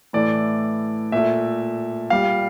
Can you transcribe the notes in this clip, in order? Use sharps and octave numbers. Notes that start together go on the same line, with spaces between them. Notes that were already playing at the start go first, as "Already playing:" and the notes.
A2 E3 A3 D5
A#2 A3 E5
A#2 G3 F5